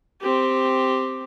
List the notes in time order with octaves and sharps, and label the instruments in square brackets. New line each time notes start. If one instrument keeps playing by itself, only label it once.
[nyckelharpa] C4 G4